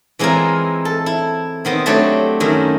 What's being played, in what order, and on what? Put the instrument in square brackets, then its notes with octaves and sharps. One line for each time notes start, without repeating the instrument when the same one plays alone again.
[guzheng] E3 G#3 C4 E4 F4 A#4
A4
E4
D#3 B3 C4 D#5
F#3 A3 C4 D4 G4 C#5
F#2 D#3 E4